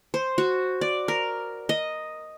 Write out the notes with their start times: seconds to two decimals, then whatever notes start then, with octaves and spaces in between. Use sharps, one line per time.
0.14 C5
0.38 F#4
0.81 D5
1.08 A#4
1.69 D#5